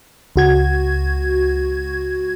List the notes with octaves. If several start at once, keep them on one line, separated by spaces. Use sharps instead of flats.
C#2 F#4 G#6